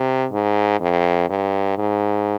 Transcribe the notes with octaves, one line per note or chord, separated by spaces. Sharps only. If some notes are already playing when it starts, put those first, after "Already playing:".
Already playing: C3
G#2
F2
G2
G#2